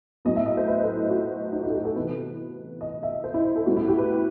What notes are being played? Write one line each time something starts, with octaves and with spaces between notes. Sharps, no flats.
A2 F#3 B3 D#5
E5
D#5
C5
B4
A4
E4
F#4
D#4
F#4
A4
G4
A4
C3 E3 B3 B4
D#5
E5
C5
E4
A4
A2 G3 B3 F#4
E4
G4
B4